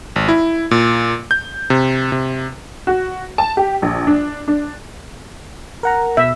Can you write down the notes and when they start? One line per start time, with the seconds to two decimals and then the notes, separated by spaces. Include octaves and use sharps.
0.16 G#1
0.29 E4
0.71 A#2
1.31 G6
1.70 C3
2.12 C3
2.87 F#4
3.38 A5
3.57 G4
3.82 A#1
4.07 D4
4.48 D4
5.83 A#4 F#5 A#5
6.17 B2 E5